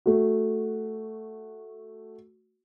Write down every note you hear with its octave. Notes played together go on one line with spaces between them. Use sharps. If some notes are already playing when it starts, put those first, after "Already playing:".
A3 F#4